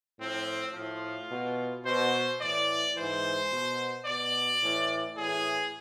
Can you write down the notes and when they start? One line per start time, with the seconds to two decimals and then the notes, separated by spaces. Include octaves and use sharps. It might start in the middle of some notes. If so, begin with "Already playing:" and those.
0.18 A2 F3 C4
0.73 A2 F3 F4
1.30 B2
1.85 B2 C5
2.40 A2 E3 D5
2.95 G#2 E3 C5
3.51 B2
4.06 B2 D5
4.62 A2 E3
5.16 A2 E3 G#4